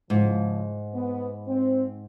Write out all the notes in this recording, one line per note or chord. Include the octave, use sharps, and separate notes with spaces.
G#2 C#3 F3
B3
C4